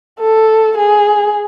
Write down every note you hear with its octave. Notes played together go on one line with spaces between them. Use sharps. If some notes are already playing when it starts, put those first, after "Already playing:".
A4
G#4